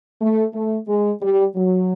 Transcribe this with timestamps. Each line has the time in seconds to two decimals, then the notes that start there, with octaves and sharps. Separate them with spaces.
0.21 A3
0.54 A3
0.88 G#3
1.21 G3
1.55 F#3